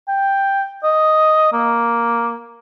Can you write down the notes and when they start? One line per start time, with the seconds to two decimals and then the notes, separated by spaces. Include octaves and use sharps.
0.08 G5
0.84 D#5
1.53 A#3